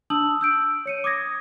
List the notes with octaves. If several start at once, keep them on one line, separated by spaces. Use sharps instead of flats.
D4 A5 D#6 E6 F#7
E6 G6 D7
C#5 C#7 D#7
D6 D#6 G#6 A#6